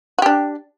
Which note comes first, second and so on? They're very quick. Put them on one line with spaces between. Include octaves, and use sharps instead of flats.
F#4 G4 D4